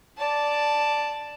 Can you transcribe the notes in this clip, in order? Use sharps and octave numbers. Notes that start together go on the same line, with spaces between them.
D5 A5